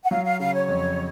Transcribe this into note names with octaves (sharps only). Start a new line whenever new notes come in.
F#5
F#3 F5
F5
C#3 F5
C#5
F2